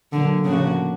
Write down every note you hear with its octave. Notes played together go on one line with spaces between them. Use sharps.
A#2 D3 F#3 A#3
A2 C#3 F3 A#3 D4 F#4